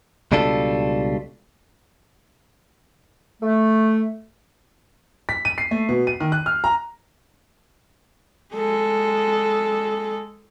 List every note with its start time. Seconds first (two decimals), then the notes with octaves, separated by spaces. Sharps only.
0.32 C#2 B2 G3 D4 F4 A4
3.42 A3
5.29 B6
5.45 D#7
5.58 C7
5.71 A3
5.89 B2
6.07 D#7
6.20 D#3
6.32 F#6
6.46 F6
6.64 A#5
8.54 G#3 A4